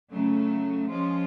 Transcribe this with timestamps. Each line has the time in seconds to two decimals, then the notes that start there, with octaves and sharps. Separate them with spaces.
0.11 C#3 F#3 A3
0.89 F3 G#3 C#4 F4